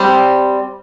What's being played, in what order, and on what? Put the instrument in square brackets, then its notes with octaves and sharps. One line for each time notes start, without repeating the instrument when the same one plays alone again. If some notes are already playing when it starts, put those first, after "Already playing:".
Already playing: [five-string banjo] G3 C4